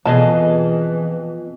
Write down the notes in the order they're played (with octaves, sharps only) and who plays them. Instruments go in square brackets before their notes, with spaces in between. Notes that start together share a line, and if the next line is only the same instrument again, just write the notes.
[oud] F2 B2 F5 [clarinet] E3 [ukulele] G#4 D#5 A5